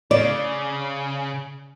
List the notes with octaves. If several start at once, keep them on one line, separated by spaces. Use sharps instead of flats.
C#3 D5